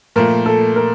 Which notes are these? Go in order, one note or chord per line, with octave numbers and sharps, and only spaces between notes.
A#2 F3 A3 A#4
A4
A#4